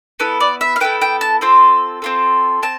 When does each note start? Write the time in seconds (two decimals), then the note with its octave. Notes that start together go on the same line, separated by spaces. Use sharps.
0.20 B3 E4 A4
0.40 D5
0.61 E5
0.76 F5
0.80 B3 E4 A4 G5
1.02 G5
1.21 A5
1.41 C4 F4 A4
2.02 C4 F4 A4
2.63 C4 A5